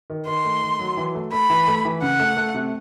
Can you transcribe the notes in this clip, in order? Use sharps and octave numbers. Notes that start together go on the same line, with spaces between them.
D#3
D#3 C6
A3
D#3
F#3
E3
A3
A3 B5
E3
A3
E3
C#3 F#5
A3
A3
C3